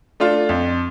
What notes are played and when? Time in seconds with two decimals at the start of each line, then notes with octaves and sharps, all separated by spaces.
0.20 A3 D4 F4
0.49 F2